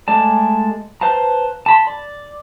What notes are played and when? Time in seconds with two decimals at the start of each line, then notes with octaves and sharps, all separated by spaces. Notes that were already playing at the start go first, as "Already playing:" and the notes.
0.08 G#3 A3 D5 A5
1.01 B4 C5 F5 A5 A#5
1.66 A5 B5 C6
1.87 D5